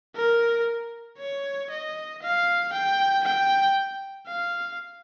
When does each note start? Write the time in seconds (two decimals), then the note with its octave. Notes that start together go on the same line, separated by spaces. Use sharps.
0.15 A#4
1.18 C#5
1.70 D#5
2.22 F5
2.73 G5
3.25 G5
4.27 F5